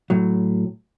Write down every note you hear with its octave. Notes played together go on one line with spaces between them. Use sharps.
A2 F#3